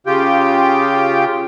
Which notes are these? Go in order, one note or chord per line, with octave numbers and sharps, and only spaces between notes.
C#3 F4 G4 G5